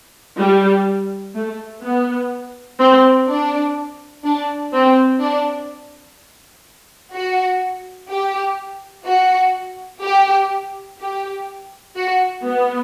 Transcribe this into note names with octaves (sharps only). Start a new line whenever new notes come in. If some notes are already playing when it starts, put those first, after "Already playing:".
G3
A3
B3
C4
D4
D4
C4
D4
F#4
G4
F#4
G4
G4
F#4
B3